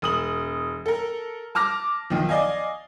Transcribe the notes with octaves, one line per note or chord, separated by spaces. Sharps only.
E1 D#6 F#7
A4 A#4
A5 D6 F6 A#6
B1 D#3 F3
D5 D#5 F5 G#5